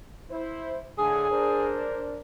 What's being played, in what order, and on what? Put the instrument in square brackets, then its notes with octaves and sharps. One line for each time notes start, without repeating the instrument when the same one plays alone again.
[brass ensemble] E4 C5
[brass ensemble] A2 D3 G#5 [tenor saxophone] G#4
[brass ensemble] D4 A#4 C5